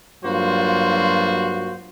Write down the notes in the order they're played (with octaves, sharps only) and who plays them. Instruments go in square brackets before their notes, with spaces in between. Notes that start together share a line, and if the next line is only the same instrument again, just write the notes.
[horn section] G2 F#3 A#3 F4 F#4 C5